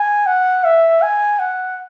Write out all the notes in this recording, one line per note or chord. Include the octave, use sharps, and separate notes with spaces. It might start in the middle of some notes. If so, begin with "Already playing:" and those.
Already playing: G#5
F#5
E5
G#5
F#5